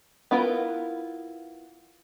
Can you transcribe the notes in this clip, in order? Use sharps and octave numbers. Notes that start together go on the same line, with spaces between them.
B3 E4 F4 A#4 B4